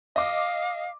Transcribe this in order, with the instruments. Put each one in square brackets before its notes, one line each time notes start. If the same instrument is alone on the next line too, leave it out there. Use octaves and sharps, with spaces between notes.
[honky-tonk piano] D#5 D6 [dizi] F5